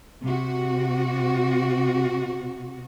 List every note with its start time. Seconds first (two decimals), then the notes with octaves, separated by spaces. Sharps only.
0.22 C3 F#4